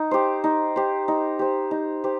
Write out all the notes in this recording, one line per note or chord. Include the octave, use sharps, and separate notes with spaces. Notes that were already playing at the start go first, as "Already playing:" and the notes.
Already playing: D#4
G4 C5
D#4
G4 C5
D#4
G4 C5
D#4
G4 C5